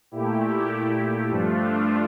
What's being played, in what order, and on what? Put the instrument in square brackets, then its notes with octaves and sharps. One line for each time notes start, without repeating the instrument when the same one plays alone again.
[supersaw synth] A#2 A3 E4 G4
G2 F3 A3 D4 F4